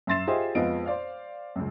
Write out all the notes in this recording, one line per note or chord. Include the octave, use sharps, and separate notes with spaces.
F#2 E5 C6 A6 C7 E7
F4 G4 G#4 C5 D#5 E5
F2 G#3 B3 F4 D#5 D7
C5 D5 F5
C#2 F#2